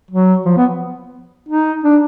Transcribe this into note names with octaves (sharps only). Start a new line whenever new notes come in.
F#3
F3
B3
D#4
D4